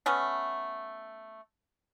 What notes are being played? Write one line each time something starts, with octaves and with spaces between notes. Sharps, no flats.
A3 B3 C#4